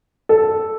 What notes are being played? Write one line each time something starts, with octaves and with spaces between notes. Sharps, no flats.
A4